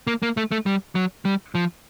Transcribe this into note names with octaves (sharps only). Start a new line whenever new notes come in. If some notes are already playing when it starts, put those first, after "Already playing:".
A#3
A#3
A3
A3
G3
F#3
G3
F3